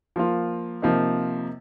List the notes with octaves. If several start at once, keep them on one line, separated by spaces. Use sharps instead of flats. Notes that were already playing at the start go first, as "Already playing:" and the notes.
F3 A#3 F4
C3 F3 A#3 D#4